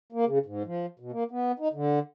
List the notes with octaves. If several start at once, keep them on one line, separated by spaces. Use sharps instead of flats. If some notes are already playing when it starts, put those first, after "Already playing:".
A#3
C#3
G#2
F3
B2
A#3
B3
D#4
D3